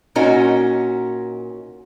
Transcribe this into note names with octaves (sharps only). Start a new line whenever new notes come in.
A#2 C#4 D#4 F#4 A#4 A#5